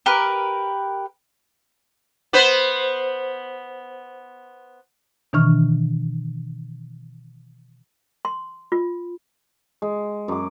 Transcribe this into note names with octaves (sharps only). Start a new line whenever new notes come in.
G4 A#4 B4
B3 B4 C5
B2 D#3 E3 D4 C#6 F6
C6
F4
G#3
F#2 D6